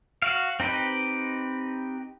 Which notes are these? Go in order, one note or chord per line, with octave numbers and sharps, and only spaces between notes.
F#4 F5
C4 D#4 G4 B4